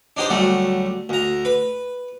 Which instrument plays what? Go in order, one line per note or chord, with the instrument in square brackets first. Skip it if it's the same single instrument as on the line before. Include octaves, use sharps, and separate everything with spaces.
[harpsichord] D4 D#4 G4 C5
D2 F#3 G3 A3
D2 A#5
B4